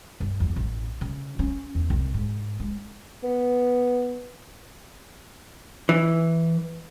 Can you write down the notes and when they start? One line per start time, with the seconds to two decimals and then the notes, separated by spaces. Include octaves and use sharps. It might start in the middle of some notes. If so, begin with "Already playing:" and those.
0.20 G2
0.40 E2
0.56 A1
1.01 C#3
1.39 C#4
1.75 E2
1.90 C2
2.14 G#2
2.60 G#3
3.23 B3
5.89 E3